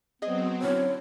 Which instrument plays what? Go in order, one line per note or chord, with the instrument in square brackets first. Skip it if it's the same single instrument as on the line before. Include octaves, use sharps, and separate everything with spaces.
[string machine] F#3 C4 [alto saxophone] B3 [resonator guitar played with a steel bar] G#4 D#5
[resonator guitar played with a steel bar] D3 C#4 E4 [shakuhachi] C#5